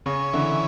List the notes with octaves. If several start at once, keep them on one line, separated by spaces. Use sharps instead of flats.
C#3 C#4
D3 E3